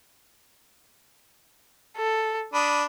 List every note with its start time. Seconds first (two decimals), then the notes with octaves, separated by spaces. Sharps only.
1.97 A4
2.54 D4 B5 D#6